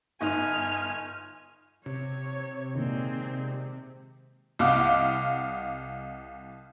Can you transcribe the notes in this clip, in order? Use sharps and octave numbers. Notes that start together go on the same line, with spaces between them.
G1 D#4 G#5 F6
C3 C#5
A#2 D#3 G#3 C4
C2 D#5 F5 F#5 D6